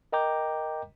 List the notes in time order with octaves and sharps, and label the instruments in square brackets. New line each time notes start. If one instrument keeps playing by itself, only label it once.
[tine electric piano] A#4 D#5 G5 A#5 D6 G6